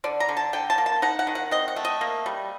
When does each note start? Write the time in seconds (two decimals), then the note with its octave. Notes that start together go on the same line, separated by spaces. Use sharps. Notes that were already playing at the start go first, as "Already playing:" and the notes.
0.04 D3 D5
0.20 A#5
0.29 D3
0.37 A5
0.53 D3 G5
0.70 A5
0.78 A#3
0.86 A5
1.02 D#4 F#5
1.19 F#5
1.27 D#3
1.35 F#5
1.51 C4 D#5
1.68 F#5
1.76 A3
1.85 D#5
2.01 A#3
2.26 G3